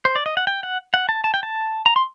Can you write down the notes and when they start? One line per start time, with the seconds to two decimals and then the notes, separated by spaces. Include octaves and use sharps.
0.05 C5
0.15 D5
0.26 D#5
0.37 F#5
0.47 G5
0.63 F#5
0.94 F#5
1.09 A5
1.24 A5
1.34 G5
1.43 A5
1.86 A#5
1.96 C6